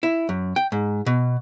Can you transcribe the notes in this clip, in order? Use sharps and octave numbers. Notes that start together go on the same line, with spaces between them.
E4
F#2
G5
G#2
B2